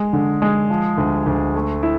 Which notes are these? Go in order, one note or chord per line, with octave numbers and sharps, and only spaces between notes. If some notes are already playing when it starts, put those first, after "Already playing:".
Already playing: G#3
D3
G#3
F3
D2
D2
A3
E4